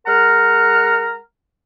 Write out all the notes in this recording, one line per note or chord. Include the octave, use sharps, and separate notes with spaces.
G#3 A#4 F#5 A#5 F6